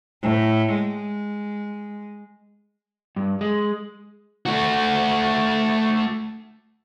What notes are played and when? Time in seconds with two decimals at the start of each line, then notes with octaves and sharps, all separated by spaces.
0.22 A2
0.73 G#3
3.16 G2
3.41 G#3
4.46 A3 F#4